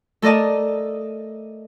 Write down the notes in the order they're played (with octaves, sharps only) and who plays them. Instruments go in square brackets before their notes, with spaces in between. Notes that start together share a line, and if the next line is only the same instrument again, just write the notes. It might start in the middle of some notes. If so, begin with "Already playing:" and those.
[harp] A3 A4 A#4 D5 D#5 A5